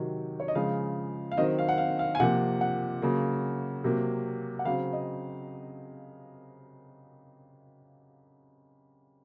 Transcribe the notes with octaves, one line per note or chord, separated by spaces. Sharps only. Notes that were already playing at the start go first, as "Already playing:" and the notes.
Already playing: C3 D#3 F#3
C#5
D#5
C#3 F3 G#3 F5
F5
D#3 F#3 C4 D#5
F5
F#5
F5
F5
G#5
C3 F3 A#3 F#5
F#5
C#3 F#3 A#3
C3 F#3 A#3
F#5
C#3 F#3 C4 F5
D#5